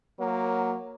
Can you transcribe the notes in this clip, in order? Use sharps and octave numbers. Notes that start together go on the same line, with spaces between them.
F#3 A#3